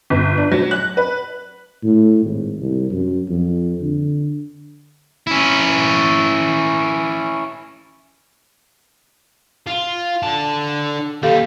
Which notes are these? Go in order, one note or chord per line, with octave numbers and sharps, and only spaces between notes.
G1
D4
F#3
F#6
B4
A2
G#1
C2
F#2
F2
D3
C#4 E4
F4
D3 A5
D#2 G3 G4 A4 F5